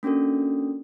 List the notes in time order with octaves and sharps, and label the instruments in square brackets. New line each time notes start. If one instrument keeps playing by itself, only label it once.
[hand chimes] A#3 C#4 D4 F#4 A4